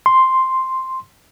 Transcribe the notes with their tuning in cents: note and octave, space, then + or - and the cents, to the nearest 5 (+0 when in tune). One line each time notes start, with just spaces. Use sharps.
C6 +0